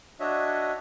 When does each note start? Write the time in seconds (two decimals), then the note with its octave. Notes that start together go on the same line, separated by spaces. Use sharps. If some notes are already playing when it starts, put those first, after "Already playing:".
0.20 D4 F#4 C#5 D#5 E5